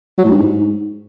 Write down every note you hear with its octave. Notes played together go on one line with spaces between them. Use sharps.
F#3
A2
G2
G#2